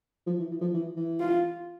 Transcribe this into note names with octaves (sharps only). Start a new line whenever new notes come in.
F3
E3
E3
F3
E3
E3
F4